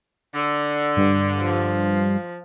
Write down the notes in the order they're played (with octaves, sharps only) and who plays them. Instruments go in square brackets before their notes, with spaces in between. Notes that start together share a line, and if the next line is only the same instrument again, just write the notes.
[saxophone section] D3
[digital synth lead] G2
[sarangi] F3